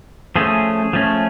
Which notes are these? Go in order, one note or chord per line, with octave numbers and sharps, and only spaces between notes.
F3 A3 C#4 G#4
F3 A3 C#4